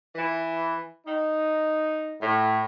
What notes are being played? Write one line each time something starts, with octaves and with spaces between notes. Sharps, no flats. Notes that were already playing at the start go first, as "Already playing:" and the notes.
E3
D#4
A2